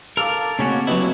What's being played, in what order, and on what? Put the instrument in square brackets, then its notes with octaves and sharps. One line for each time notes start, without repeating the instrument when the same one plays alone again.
[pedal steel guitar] A4 D6 [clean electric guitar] A#4 [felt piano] F5 E6 [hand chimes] F6
[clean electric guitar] C#3 C#4 F#4 [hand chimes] A3 A#3 C4
[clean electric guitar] F#3 E4 [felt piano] G4 B4 D#5